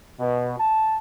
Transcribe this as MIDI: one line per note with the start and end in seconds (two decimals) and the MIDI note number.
0.19 0.56 47
0.60 0.98 81